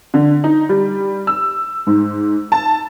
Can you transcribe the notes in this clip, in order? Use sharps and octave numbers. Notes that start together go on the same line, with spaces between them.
D3
D#4
G3
E6
G#2
A5